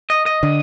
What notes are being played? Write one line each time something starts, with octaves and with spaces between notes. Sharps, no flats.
D#5
D#5
D3